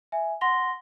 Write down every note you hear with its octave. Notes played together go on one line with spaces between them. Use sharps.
E5 G#5
F#5 C6 A#6 G7